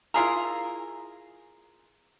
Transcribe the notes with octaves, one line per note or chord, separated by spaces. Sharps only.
E4 F4 G#4 A#4